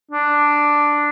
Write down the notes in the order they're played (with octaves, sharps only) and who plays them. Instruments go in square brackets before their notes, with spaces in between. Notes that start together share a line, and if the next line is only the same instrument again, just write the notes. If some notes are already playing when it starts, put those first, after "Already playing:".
[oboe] D4